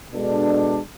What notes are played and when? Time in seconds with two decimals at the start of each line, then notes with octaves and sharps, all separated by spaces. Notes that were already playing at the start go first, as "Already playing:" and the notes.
0.12 B2 G#3 D4 A4